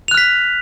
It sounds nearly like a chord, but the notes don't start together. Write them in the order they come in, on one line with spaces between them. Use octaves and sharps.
F7 F#6 F6 B6